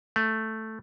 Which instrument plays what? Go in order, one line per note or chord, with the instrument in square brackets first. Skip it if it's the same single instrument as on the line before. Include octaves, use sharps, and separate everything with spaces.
[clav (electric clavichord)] A3